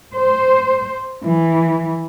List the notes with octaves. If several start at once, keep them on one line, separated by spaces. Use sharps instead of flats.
C5
E3